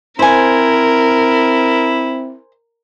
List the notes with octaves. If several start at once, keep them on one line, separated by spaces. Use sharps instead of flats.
C4 E4 A#4 C5 G#5